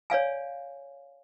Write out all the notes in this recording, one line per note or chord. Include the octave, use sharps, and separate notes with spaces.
C#5 D5 F5 G#5